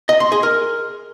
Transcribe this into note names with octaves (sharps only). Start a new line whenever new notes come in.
D#5
C6
G#4
A#4